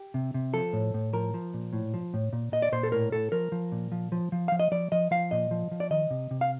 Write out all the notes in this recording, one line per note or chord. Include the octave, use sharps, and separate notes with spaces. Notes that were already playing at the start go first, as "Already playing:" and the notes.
Already playing: G4
C3
C3
F3 A4
A2
A2
F3 A#4
F3
A#2
A2
F3
A2
A#2
A#2 D#5
D5
A#2 C5
A4
A2 A#4
A2 A4
F3 A#4
F3
A#2
F3
F3
F3
F3 F5
D#5
F3 D5
F3 D#5
F3 F5
A#2 D#5
F3
F3
D5
D#3 D#5
C3
C3
F5